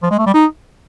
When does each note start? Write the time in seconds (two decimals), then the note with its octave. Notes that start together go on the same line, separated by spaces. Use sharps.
0.03 F3
0.11 G#3
0.18 A3
0.26 G3
0.34 D#4